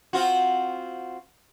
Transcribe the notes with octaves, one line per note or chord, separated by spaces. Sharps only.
C4 F4 F#4